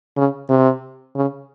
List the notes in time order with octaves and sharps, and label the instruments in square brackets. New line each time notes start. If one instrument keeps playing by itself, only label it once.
[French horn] C#3
C3
C#3